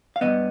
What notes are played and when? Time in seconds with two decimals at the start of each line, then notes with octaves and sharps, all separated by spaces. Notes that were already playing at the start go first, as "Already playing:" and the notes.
0.16 F5
0.21 G2 D#3 B3 D#5